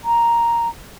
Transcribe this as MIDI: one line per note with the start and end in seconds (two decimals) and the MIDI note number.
0.04 0.68 82